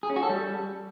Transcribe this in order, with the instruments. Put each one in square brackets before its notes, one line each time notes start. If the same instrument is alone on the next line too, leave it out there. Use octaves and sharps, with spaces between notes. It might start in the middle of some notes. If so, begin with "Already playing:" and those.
[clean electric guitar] G#4
C#4
F#4
A4
G3